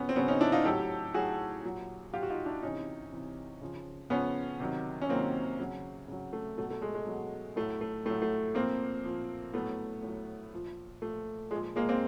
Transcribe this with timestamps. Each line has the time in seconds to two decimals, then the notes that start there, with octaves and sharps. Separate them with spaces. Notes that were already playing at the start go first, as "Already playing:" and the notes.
Already playing: C#3 F#3 B3 C#4
0.09 C4
0.16 C#3 F#3 B3 C#4
0.28 C#4 D#4
0.41 D4 E4
0.52 D#4 F4
0.65 A2 F#3 G4 A4
1.14 A2 F#3 F#4 G#4
1.64 A#2 F#3
2.13 A#2 F#3 F4 G4
2.23 F#4
2.30 D#4 F4
2.46 D4 E4
2.62 C3 E3 C#4 D#4
3.12 C3 E3
3.61 C#3 F3
4.10 C#3 F3 B3 C#4
4.60 C3 D#3 F#3
5.02 C#4
5.09 C3 D#3 F#3 A#3 C4
5.59 C#3 F#3
6.08 C#3 F#3
6.33 A3
6.57 B2 F#3 A3
6.70 A3
6.82 G#3
6.95 G#3
7.06 B2 F#3
7.56 A2 F#3 A3
7.81 A3
8.06 A2 A3
8.09 F#3
8.22 A3
8.55 A#2 F3 A#3 C4
9.04 A#2 F3
9.54 A2 F#3 A3 B3
10.03 A2 F#3
10.53 A#2 F3
11.02 A#2 F3 A3
11.51 A#2 F3 G#3
11.76 G#3 A#3
11.89 A#3 C4